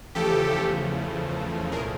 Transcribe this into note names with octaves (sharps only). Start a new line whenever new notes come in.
E2 C#3 F3 A3 G4 A4
C2 A#2 F3 A3 G#4 A#4